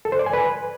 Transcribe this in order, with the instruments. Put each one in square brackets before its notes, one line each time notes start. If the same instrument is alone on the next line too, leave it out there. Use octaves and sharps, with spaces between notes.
[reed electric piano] A4
C5
D5
G#5
B4